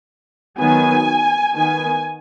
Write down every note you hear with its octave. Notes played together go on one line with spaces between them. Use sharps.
D#3 F#3 B3 G#5
D#3 B3 G#5